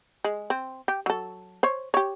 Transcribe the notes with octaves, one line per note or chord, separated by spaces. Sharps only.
G#3
C4
G4
F#3 A4
C5 C#5
G4 C#5